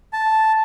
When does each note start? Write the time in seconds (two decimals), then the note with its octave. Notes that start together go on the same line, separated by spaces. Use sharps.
0.13 A5